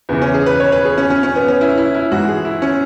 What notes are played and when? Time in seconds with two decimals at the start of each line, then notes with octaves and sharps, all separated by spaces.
0.09 E2 C#3 E3 B3
0.22 C#4
0.34 G#4
0.46 B4
0.60 C#5
0.72 B4
0.85 G#4
0.98 C#4
1.10 C#4
1.23 C#4
1.36 B3
1.48 C#4
1.61 E4
1.78 E4
1.95 E4
2.11 G#2 E3 F#4
2.28 G#4
2.45 E4
2.62 C#4